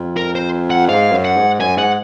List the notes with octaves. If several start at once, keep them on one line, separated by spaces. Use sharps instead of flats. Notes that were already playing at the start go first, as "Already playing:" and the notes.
Already playing: F2
A#4
C5
F#5
G#2 F5
F#2
F#5
G#2
F#2 G#5
G#2 F#5